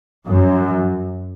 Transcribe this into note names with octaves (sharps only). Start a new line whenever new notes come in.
F#2